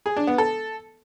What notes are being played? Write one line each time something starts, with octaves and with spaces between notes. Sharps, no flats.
G#4
D4
B3
A4